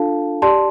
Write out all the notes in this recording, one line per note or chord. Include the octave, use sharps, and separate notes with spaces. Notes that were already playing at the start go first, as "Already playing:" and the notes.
Already playing: D4 F4 A4 F5 A5
G4 D5 A5 C6